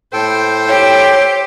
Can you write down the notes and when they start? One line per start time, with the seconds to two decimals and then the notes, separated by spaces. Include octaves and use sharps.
0.13 A2 A4 C5 G5
0.68 G4 C#5